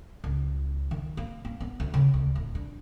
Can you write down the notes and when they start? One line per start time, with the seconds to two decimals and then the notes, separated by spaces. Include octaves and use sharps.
0.24 C#2
0.91 D#3
1.17 A#3
1.45 A#3
1.60 B3
1.80 D2
1.94 C#3
2.14 D2
2.36 D1
2.55 D4